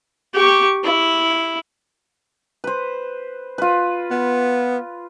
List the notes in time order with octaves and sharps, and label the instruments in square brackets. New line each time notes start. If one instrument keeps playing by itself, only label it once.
[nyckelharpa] G4 C#6
E4
[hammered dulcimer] B4 C5
F4 B4
[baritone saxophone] B3